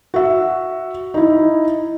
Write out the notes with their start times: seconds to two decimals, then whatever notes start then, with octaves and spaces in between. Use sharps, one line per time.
0.14 F#4 E5
1.14 D#4 E4